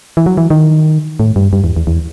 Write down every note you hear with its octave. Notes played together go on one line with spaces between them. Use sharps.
E3
F#3
E3
D#3
A2
G2
G2
E2
E2
E2